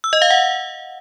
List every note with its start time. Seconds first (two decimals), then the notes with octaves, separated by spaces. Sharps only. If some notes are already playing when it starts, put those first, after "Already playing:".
0.04 E6
0.13 D#5
0.22 F5
0.30 F#5